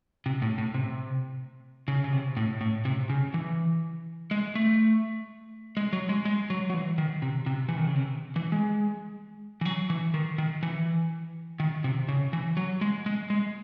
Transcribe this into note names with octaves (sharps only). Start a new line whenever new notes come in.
C3
A2
A2
C3
C#3
C#3
C3
A2
A2
C3
C#3
E3
G#3
A3
G#3
F#3
G#3
G#3
F#3
F#3
E3
D#3
C3
C3
E3
D#3
C#3
C3
E3
G#3
E3
F#3
E3
D#3
D#3
E3
D#3
C3
C#3
E3
F#3
G#3
G#3
G#3